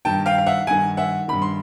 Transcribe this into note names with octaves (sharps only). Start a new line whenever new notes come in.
G2 D#3 G5 A5
F5 G5
F5
E5 F#5
G2 D#3 F#5 G#5
E5 F#5
G2 D#3 B5
C6